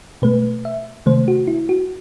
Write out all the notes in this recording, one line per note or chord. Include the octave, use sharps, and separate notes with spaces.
B2 A3 B4
E5
C3 D#3 A3 C5
F#4
E4
F#4